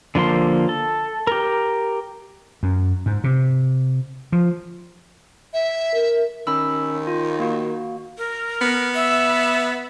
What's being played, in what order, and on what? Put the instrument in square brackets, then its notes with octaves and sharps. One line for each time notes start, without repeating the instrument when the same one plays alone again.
[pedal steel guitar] D3 F3 A#3 C6
A4
G4 A#4
[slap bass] F#2
G#2
C3
F3
[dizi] E5
[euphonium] A#4
[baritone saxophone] D#3 [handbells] C#4 B5 E6
[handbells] F4
A#3 F#4
[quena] A#4
[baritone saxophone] B3
[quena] E5